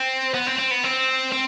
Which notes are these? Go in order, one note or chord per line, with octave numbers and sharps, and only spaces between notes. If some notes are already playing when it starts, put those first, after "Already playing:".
Already playing: C4
B3
C4
C4
B3
C4
C4